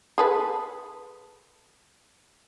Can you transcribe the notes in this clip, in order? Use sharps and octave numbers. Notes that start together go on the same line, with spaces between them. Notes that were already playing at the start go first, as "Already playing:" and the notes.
G#4 A4 B4